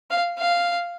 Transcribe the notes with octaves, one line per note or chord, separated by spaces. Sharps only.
F5
F5